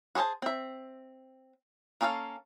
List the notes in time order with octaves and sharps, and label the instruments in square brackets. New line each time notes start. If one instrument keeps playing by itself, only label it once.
[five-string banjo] F#4 G#4 A4 C5 A5
C4 E5
A#3 C#4 G#4 A4 F5